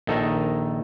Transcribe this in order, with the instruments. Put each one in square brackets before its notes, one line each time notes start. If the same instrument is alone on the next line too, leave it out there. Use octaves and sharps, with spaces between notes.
[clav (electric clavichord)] A#1 D#3 A4 D#5 A#5